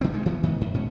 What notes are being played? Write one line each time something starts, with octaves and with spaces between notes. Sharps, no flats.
D3 D#3 C4
G2 G#3
E3 F#3 B3
G#2 D#3 E3 B3
F#2
G#2 B2 C#4